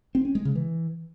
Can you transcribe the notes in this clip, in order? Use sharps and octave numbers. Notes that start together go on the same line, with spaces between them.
C4
C#4
G#3
C#3
E3